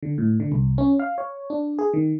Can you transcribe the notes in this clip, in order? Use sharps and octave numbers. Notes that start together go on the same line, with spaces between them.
D3
A2
D3
C2
C#4
F5
C#5
D4
G#4
D#3